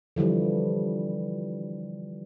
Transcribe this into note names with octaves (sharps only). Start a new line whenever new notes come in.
D3 E3 F3 G3